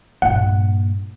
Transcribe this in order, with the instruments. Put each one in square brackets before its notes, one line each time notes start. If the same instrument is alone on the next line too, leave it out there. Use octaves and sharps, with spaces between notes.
[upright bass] G2 A#2 [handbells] F#5